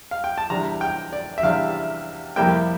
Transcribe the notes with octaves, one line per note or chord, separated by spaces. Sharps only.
F5
G5
A5
E2 C3 G3 D4 A#5
G5
D5
E5
E2 C3 G3 D4 F5
F2 C3 G3 A#3 E4 G5